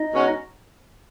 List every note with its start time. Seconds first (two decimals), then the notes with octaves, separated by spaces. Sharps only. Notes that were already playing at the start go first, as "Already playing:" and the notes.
Already playing: D#4 D#5
0.12 B2 G#3 C#4 F#4